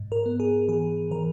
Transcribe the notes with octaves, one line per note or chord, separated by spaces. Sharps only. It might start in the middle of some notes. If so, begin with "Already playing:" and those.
Already playing: G#2
A#4
B3
G#4
E3 G#4
E3 A#4